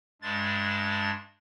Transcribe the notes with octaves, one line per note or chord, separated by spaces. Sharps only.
G2 G#3 D4 A6